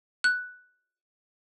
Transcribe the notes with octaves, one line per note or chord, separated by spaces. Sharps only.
F#6